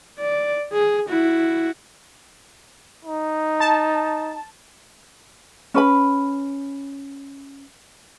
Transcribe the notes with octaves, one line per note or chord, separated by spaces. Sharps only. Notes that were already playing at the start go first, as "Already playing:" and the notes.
D5
G#4
E4 F#4
D#4
A5
C#4 B4 B5